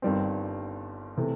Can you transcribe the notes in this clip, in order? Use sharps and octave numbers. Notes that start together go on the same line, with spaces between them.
G1 G2 D#3 G3 C4
C3 E3 A3